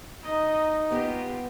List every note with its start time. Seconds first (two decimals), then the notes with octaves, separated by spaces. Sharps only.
0.23 D#4 D#5
0.90 B3 F4 G4 D#5